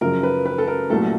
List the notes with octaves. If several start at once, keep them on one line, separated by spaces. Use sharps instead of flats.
F#2 C#3 F3 A#4
B4
B4
A4
A#4
C2 A#2 F#3 A3 A4